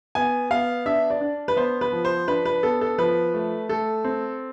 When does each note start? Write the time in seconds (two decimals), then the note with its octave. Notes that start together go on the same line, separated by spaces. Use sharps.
0.15 B3 G#5
0.51 B3 F5
0.86 D4 E5
1.10 D5
1.21 D4
1.48 B4
1.56 B3 C5
1.81 B4
1.92 F3
2.05 C5
2.28 D4 B4
2.45 B4
2.63 B3 A4
2.81 A4
2.98 F3 B4
3.34 A3
3.69 A3 A4
4.04 C4